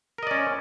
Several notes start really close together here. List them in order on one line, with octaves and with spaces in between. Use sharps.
A#4 D#5 D5 C#4